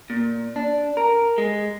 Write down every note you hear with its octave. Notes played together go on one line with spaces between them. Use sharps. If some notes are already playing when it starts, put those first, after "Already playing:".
A#2
D4
A#4
G#3